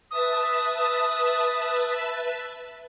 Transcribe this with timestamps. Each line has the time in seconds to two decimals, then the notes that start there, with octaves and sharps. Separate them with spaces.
0.11 B4 E5 A5 D#6